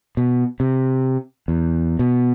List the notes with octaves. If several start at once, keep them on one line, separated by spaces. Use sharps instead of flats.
B2
C3
E2
B2